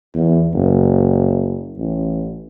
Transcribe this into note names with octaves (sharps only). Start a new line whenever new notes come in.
E2
F#1
A1